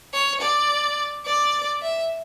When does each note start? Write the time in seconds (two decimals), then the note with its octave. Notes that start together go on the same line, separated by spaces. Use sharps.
0.13 C#5
0.41 D5
1.26 D5
1.82 E5